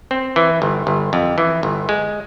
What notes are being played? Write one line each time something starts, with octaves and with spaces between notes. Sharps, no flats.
C4
E3
G1
G1
F2
E3
G1
G#3